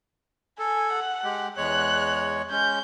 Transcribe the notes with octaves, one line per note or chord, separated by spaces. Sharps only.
A4 G#5
F#5
G#3 G4
E2 G#3 C#5 F#6
G#3 C#4 G6